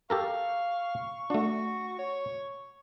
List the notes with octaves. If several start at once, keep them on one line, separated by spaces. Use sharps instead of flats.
G4 A4 A#4 F5 C#6
A3 D4 F#4
C#5